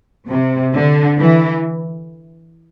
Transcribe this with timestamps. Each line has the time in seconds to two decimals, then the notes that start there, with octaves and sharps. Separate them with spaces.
0.29 C3
0.74 D3
1.19 E3